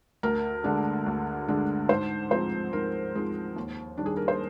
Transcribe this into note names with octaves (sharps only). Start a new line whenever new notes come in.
D2 A#4
D3 G#3 D4
D2
D3 G#3 D4
G#2 C5
F3 G#3 C4 D#4 C5
G#2 A#4
F3 G#3 C4 D#4
D#2
D#3 G3 D4
G#4
A#4
C5